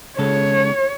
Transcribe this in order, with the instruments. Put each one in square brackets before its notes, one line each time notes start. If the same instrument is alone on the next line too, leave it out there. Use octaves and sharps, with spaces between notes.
[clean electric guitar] C#3 G#3 A4 [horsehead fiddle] C#5